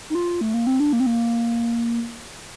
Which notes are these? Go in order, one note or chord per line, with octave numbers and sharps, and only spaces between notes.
D#4
F4
A3
A#3
C4
D4
A#3
C4
A#3